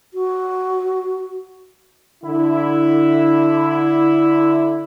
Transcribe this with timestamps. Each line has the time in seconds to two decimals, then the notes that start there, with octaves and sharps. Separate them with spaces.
0.14 F#4
2.24 D3 E4